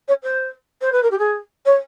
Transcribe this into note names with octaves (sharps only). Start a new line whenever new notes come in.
C#5
C5
C5
B4
A#4
G4
G#4
C#5